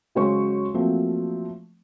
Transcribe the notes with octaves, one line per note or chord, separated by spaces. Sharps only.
C#3 F#3 G#3 C5 C#5 C#6
F3 F#3 A3 A#3 C4